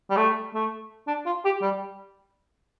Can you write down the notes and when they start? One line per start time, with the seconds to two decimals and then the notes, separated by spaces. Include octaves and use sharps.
0.11 G3
0.17 A3
0.54 A3
1.08 D4
1.26 F4
1.45 G4
1.62 G3